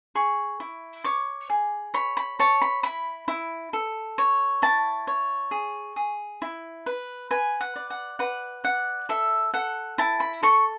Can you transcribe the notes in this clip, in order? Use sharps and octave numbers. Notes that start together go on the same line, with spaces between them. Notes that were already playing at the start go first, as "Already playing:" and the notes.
G#4 C#6
E4
C#5 D6
G#4
C#5 B5
B5
C#5 A5
B5
E4 B5
E4
A4
C#5
E4 A5
C#5
G#4
G#4
E4
B4
B4 G#5
F#5
D5
F#5
B4 F#5
D5 F#5
A4 E5
A4 F#5
E4 A5
B5
A4 C#6